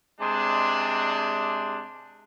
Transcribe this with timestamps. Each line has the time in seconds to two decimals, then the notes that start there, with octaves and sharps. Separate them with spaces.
0.21 C3 G#3 D4